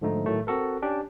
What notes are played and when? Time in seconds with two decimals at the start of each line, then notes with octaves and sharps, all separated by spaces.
0.01 G#2 D3 F3 A3 D#4
0.26 A2 D#3 F#3 A3
0.47 C4 F#4 A4 A#4
0.82 C#4 D4 G4